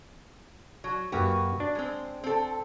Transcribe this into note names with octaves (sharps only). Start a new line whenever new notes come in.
F#3
F#2 A#3 F#4 G4 B4
D4
G#3 C4
C4 A4